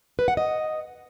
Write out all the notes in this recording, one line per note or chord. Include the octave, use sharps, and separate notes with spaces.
B4
F#5
D#5